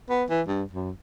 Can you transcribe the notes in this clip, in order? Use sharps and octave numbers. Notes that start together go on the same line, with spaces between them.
B3
E3
G2
F#2